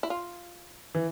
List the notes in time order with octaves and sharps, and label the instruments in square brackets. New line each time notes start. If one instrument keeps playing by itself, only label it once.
[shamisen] E4
F4
[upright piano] E3